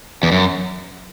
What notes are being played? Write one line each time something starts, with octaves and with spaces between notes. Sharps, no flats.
E2
F#2